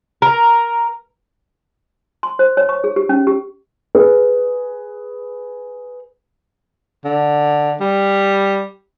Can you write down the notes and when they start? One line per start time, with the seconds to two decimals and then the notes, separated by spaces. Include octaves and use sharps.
0.22 A#4
2.23 C6
2.39 C5
2.57 C#5
2.69 C#6
2.84 G#4
2.96 G4
3.09 C#4
3.27 G4
3.95 G#4 B4
7.05 D3
7.81 G3